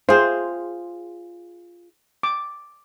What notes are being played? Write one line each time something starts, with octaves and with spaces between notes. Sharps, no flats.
F4 G#4 C5
D6